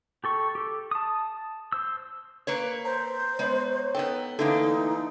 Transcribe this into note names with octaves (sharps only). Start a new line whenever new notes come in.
G4 A4 C#6
G4 A4
A5 D#6
C5 E6
A#3 B4 C#5
C5 A#5
G#3 B3 C#5
B3 D#4 A4 G5
D3 E3 A3 A#3 D#4 A4